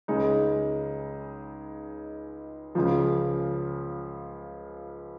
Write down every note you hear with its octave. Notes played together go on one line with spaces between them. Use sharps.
C#2 C#3 G#3 D#4
C#2 C#3 F3